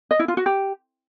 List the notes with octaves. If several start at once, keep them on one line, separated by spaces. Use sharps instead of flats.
D#5
E4
F4
F#4
G4